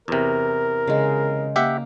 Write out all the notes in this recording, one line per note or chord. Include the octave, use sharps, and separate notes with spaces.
E2 C3 A#4
C#3 G#3
A#3 G4 E5 F#5